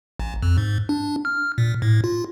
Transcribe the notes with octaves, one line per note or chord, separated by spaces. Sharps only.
A1
F2
G#2
D4
F6
A#2
A2
F4